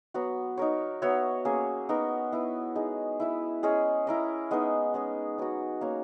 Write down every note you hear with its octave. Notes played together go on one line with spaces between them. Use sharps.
F#3 B3 F#4
D#4 A#4 C#5
B3 F#4 C#5 E5
A#3 C#4 G#4
B3 D#4 F#4 A#4
B3 E4 B4
G#3 D#4 G#4
E4 B4 E5
G#3 C#4 G#4 D#5
E4 A#4 D#5
G#3 B3 D#4
G#3 C#4 G#4
F#3 B3 F#4
A#3 C#4 F#4 C#5